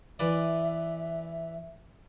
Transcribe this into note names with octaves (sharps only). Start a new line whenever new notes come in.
E3 B4 D5 E5